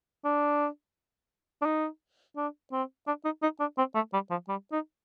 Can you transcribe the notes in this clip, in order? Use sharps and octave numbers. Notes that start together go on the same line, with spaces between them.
D4
D4
D#4
D4
C4
D4
D#4
D#4
D4
C4
A3
G3
F3
G3
D#4